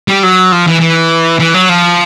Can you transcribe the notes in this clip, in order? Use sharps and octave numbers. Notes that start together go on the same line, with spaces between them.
G3
F#3
F3
E3
E3
E3
F#3
F3